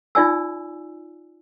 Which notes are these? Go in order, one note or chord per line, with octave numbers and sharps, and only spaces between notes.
D#4 F4 D5 G#5 E6